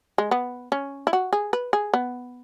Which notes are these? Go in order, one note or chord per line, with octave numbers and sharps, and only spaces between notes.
G#3
B3
C#4
E4
F#4
G#4
B4
G#4
B3